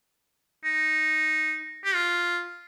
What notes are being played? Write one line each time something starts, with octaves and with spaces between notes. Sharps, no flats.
D#4
G4
F4